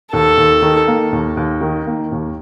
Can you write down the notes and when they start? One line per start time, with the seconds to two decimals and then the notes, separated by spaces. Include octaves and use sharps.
0.12 D#2 A4
0.37 D#2
0.62 D#3
0.88 A#3
1.13 D#2
1.37 D#2
1.61 D#3
1.87 A#3
2.12 D#2